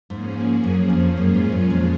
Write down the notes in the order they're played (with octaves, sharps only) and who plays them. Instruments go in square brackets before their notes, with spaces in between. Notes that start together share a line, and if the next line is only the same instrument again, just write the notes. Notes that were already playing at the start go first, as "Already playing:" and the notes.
[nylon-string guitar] G#2 [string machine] F3 A#3 C#4 G#4
[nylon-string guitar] F#2
F2
[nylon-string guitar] F#2 [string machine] A#2 G#3 C#4 F4 G#4
[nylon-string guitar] G#2
F#2
F2